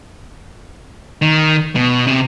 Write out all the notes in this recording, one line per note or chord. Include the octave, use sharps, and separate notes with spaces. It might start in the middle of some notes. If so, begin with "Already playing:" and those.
D#3
B2
C3